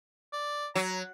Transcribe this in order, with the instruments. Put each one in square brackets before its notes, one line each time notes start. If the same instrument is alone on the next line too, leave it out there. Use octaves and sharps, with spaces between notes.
[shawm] D5
[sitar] F#3 [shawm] A#5